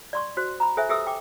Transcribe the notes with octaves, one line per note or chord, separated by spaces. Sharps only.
D5 C6 C#6
F#4 C5
A#5 B5
A4 C5 E5 G#5
G4 A4 B4 E5 D#6 E6
G5 D6